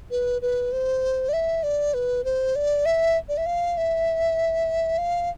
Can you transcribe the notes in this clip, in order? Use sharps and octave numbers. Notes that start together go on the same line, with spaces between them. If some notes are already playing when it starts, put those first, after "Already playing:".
B4
B4
C5
D5
E5
D5
B4
C5
D5
E5
D5
E5
F5
E5
F5